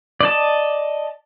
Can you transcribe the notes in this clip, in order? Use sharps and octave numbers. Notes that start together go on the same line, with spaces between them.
D5 D#5 A5